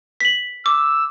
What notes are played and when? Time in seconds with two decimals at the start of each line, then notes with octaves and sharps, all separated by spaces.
0.20 B6 F#7
0.66 D6 E6